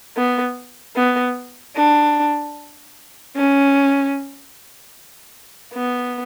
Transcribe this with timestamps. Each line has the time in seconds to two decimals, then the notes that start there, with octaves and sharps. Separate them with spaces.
0.17 B3
0.96 B3
1.76 D4
3.36 C#4
5.74 B3